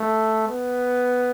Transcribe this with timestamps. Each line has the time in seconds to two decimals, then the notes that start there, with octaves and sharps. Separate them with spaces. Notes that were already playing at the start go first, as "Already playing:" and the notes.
Already playing: A3
0.49 B3